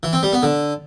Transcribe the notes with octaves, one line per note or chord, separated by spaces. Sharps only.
E3
C4
G3
B3
D3